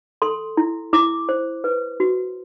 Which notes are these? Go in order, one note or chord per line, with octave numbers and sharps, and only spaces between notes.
A4 C6
E4
E4 D6
C5
B4
F#4